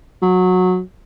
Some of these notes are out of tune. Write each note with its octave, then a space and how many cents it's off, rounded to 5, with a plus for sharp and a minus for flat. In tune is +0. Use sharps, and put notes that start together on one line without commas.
F#3 -15